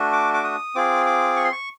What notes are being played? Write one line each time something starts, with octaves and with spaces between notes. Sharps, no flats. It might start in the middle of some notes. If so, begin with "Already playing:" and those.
Already playing: A3 D4 F#4
D6
D6
D#6
C4 F4 G#4 D6
D6
C#6
C6
C#6